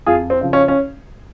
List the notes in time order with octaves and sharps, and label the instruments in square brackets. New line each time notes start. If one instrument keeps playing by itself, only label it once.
[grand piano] F2 F4 G#4
C4
C#3 F3
C#4
C#4